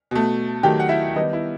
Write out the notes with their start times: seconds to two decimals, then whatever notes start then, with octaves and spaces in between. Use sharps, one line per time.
0.11 B2 A3
0.63 D#3 F#3 A3 G4 G5
0.80 F#5
0.89 E4 E5
1.15 D#3 G3 B3 D#4 D#5
1.33 E4